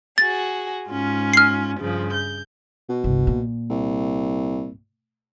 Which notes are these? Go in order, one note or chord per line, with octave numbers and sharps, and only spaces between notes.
F#4 G#4 A6
G#2 C#4 F4
F6 C7
G2 C#3 F3
G6
B2
G1 C2
A#2
C2